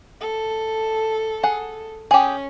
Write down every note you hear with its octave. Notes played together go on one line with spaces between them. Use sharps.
A4
G#4 F#5
C#4 G4 G#4